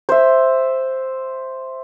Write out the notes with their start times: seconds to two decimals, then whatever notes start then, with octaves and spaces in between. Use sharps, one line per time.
0.09 C5 E5